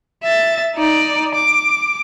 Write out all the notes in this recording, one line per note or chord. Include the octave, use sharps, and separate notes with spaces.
E5 A6
D#4 D5
D6